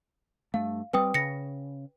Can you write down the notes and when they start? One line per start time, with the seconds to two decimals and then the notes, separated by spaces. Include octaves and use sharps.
0.54 G2 A3 F5
0.93 G3 C4 B4 G5 D#6
1.14 C#3 A#6 C#7